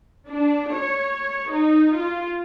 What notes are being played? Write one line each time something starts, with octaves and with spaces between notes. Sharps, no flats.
D4
C#5
D#4
F4